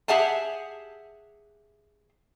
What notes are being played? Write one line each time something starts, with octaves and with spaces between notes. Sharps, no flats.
G4 G#4 E5 F#5 G#5 A5